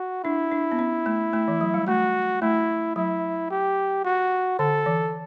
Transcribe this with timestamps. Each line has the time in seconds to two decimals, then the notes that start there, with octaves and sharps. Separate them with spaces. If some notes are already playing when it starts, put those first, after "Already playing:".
Already playing: F#4
0.24 D4 E4
0.52 D4
0.72 B3
0.79 C#4
1.06 A3
1.33 A3
1.48 E3
1.61 F#3
1.74 G3
1.87 A3 F#4
2.42 A3 E4
2.96 F#3 E4
3.50 G4
4.05 F#4
4.59 D3 A4
4.86 E3